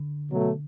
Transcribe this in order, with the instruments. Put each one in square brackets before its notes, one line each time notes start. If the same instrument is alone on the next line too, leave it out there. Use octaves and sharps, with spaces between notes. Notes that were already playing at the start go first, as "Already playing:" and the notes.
Already playing: [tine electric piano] D3
[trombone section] B2 F#3 A3